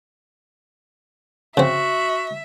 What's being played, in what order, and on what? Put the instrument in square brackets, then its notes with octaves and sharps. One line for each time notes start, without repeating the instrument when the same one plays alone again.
[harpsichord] C#3 C4 [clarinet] F#4 [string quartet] E5